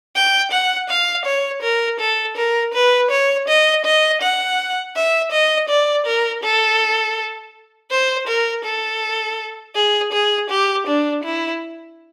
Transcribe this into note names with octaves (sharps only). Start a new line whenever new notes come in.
G5
F#5
F5
C#5
A#4
A4
A#4
B4
C#5
D#5
D#5
F#5
E5
D#5
D5
A#4
A4
C5
A#4
A4
G#4
G#4
G4
D4
E4